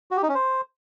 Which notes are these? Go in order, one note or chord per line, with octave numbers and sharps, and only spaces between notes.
F#4
G4
D#4
C#4
C5